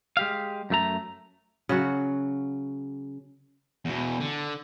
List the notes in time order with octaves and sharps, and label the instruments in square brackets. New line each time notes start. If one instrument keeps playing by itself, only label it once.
[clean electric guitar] G#3 G4 F5
F#2 A3 A#5
[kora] C#3 F#3 F#4
[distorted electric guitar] E2 B2
D3